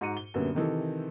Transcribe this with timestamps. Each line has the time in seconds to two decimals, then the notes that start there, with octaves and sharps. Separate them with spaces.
0.01 G#2 F#4 A#5 C#7 D#7
0.17 G7
0.34 F#2 A#2 D3 G3 B3
0.55 C3 D#3 E3 A4